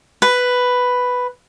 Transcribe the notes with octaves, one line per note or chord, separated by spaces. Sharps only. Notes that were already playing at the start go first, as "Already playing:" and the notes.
B4